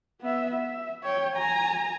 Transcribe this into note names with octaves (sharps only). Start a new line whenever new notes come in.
B3 E5
E5
C#5 G5
G#5 A#5